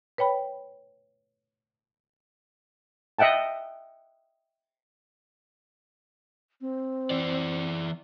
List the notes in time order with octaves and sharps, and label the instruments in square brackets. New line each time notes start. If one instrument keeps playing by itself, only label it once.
[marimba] B4 C#5 G5 B5
[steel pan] D#5 E5 F#5 G5 A5
[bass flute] C4
[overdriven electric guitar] E3 D5